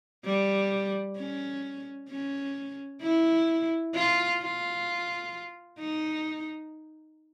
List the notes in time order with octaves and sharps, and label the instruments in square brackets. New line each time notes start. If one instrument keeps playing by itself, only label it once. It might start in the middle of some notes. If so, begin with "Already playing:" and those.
[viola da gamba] G3
C#4
C#4
E4
F4
F4
D#4